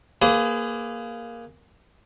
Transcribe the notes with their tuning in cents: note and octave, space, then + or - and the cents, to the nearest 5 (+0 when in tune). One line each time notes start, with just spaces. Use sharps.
A#3 +0 G#4 +0 B4 +30